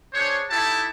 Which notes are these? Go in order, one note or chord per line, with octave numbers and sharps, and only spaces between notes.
D4 G#4 C5 C#5
D#4 E4 G4 A4 G5 A5